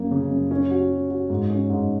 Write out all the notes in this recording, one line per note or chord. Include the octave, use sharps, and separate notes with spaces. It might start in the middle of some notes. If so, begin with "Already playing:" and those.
Already playing: F#2 A#3
C#3
F#2
C#4
F#4
F#3
F#4
G#2
C#4
G#2